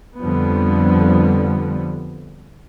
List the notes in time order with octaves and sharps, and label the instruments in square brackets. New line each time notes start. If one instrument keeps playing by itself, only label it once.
[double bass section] F2 D3 F3 G3 B3